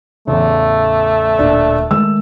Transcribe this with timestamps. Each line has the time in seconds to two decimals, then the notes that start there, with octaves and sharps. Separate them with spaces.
0.27 A1 E2 C#3 A3
1.39 D1 A#2 D4
1.91 D#3 G#3 A3 E6